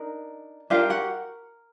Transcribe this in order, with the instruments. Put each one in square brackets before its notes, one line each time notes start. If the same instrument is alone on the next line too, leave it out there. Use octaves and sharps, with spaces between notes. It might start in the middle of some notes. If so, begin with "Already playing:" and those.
Already playing: [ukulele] D4 D#4 A#4
D4 F4 G4 A#4 F5
F#4 F#5